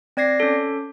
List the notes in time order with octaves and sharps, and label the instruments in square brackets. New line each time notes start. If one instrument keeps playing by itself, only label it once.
[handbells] C4 D5 G#6 A#6 C7
C#4 A4